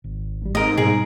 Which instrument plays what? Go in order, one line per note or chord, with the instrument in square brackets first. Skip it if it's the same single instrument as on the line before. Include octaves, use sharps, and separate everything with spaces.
[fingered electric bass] G#1
[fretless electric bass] A1 G3
[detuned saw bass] G#2 [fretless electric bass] A3 C4 [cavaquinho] A#4 D#5
[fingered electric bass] B2 G3 [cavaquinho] G#4 A#4